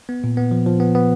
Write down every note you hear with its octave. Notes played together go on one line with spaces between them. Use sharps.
B3
A#2
B3
F3
F3
B3
B3